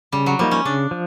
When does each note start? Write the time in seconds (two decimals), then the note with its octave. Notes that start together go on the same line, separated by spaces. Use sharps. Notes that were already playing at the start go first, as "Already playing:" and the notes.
0.12 C#3 G3
0.26 F#3
0.39 F3 G3 A#3 D#4
0.51 C#4
0.65 C#3 D4
0.91 F3